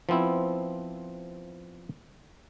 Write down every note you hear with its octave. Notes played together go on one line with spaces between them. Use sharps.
F3 B3 C4 E4